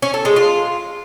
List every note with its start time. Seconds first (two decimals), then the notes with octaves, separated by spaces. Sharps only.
0.02 C#4
0.14 A4
0.25 G#3
0.36 F4